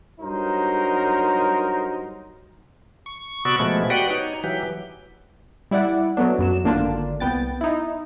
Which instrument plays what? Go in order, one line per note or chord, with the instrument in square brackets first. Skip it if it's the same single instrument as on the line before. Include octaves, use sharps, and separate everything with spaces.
[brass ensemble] G2 F#3 D#4 A#4 C5
[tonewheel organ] C#6
C3 B3 F#4 D5 C#6 E6
B2 F3 G#3 A3 B3
F#4 G4 B4 D5 F#5 G5
D#4 C#5
E3 F#3 G4
[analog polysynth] G3 E4 D5 F#5
F#3 A3 B3 D4
F#2 F#3 E7
G#1 D3 A#3 D4 F4
C2 B3 G5 A6
D#4 E4